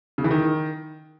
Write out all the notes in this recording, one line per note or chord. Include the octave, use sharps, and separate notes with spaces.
C#3
E3
D#3